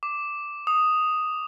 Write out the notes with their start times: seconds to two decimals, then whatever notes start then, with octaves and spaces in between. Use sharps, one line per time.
0.03 D6
0.67 D#6